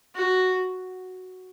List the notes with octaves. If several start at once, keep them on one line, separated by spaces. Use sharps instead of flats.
F#4